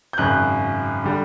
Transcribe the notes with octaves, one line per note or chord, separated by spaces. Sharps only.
G6
G#1 F#2 C#3 F#6
D3 G3